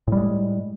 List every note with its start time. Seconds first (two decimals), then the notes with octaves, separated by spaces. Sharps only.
0.08 A2
0.12 G3
0.17 G#3